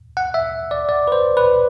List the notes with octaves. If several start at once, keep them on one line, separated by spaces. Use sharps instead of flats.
F#5
E5
D5
D5
B4
C5
B4